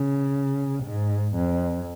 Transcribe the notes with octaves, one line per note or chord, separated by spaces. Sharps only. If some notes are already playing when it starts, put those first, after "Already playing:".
Already playing: C#3
G#2
F2